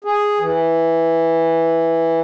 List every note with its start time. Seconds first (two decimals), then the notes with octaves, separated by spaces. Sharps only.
0.04 G#4
0.39 E3